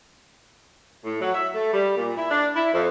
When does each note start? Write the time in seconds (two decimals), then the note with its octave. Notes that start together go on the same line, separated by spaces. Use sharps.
1.05 A2
1.21 F#3
1.34 E5
1.54 A3
1.73 G3
1.96 A#2
2.17 E4
2.30 D4
2.56 E4
2.73 F2